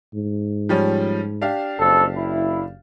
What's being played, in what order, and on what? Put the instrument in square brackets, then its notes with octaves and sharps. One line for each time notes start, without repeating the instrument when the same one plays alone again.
[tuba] G#2
[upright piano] F3 G3 C#4
D4 G4 F5
[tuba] F#1 [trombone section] F2 A4
[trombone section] E4